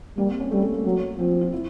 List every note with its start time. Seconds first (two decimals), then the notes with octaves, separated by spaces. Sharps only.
0.17 G3 A#3
0.29 C4
0.40 C#4
0.51 G3 A3
0.63 A3
0.74 A#3
0.85 F#3
1.18 F3 C4
1.41 F4
1.52 E4